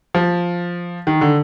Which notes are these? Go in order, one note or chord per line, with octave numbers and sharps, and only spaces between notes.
F3
D#3
D3